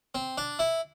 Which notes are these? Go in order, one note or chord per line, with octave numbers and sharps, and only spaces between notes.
C4
D4
E4